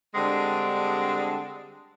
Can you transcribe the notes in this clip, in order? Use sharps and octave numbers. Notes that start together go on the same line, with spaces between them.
D3 G3 G#3 C4 D4